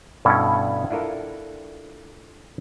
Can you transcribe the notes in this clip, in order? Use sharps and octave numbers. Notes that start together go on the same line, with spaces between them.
G2 B2 C#4 E4 A4 D5
D4 E4 F4 A4 A#4